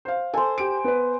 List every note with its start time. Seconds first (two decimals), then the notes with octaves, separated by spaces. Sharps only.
0.05 C5 F5
0.34 A4 C5 G#5
0.58 G4 D7
0.84 B3 B4